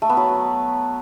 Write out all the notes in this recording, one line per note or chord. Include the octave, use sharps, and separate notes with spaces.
A3
B3
F#3